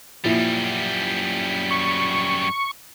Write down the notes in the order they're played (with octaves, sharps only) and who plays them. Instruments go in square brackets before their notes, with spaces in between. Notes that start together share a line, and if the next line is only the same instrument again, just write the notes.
[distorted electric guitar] F#2 G3 [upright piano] A#2 F3 E4
[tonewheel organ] C#6